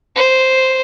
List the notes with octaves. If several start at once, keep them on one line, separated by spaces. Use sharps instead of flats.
C5